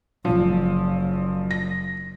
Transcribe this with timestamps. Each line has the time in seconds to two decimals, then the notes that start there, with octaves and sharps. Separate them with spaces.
0.25 F#1 F3
1.51 A#6